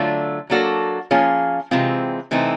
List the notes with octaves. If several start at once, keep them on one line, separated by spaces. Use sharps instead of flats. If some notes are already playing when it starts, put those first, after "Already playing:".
Already playing: D3 F#3 A3 D4 F4
F#3 A#3 D4 F#4 A4
F3 A#3 C#4 F4 G#4
C3 E3 G#3 C4 F4
C3 E3 A3 C4 D#4